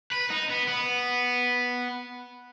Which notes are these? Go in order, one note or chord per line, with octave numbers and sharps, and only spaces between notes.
B4
D#4
B3
B3